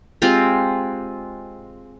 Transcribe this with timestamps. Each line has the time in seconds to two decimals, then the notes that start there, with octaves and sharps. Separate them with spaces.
0.22 G#3 C4 F4 G4